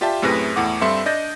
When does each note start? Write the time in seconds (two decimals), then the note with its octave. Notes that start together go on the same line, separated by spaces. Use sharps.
0.01 F4 G4 D5 E5 G5 A5
0.22 F#2 A2 C3 G#4 B4 A#6
0.56 E2 A2 F#5 D6
0.81 G2 C4 A4 E5 C6 C#7
1.06 D4 D5 D#5 G6 A#6